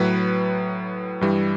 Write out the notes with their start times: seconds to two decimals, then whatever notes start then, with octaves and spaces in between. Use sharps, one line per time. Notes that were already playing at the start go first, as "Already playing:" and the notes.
Already playing: A2 F#3 B4
1.21 G2 E3 G3